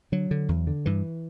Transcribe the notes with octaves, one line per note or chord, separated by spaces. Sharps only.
D3 F#3
D3
E2
D3
G2 E3